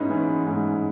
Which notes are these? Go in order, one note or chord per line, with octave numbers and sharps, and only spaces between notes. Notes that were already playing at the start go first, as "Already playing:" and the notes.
Already playing: G#2 G#3 B3 C#4 D#4 E4
E3 C#4
G#2 D#4